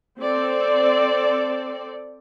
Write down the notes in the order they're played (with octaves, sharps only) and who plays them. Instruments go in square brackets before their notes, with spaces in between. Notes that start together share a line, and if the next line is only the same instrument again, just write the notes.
[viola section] C4 A4 D5